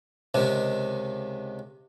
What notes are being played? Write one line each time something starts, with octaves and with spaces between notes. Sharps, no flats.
C#2 C3 D#3